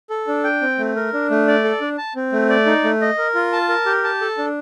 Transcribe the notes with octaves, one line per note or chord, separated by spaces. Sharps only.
A4
D4
G5
C4
A3
A#4
D4
A3
D5
A4
D4
A5
C4
A3
D5
D#4
A3
D#5
A#4
F4
A5
A#4
G4
A5
A4
D4